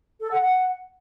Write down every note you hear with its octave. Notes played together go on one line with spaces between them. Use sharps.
A4
F#5
F#5